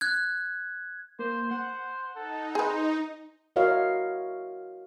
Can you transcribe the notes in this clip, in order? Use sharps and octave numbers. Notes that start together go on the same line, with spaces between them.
F#6 G#6
A#3 C5
C5 F#5
D#4 A4
G#4 B4 C5
E4 F#4 A#4 C#5 D#5 F5